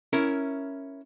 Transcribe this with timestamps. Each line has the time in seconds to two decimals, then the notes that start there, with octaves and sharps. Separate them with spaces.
0.13 C#4 E4 A#4